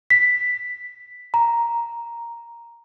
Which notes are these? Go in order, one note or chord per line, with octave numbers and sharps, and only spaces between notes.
B6
A#5